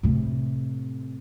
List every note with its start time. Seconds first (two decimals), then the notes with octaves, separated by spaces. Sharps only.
0.03 A2 C3